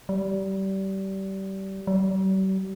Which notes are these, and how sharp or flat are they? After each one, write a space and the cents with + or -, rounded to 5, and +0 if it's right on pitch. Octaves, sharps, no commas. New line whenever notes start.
G3 -25
G3 -45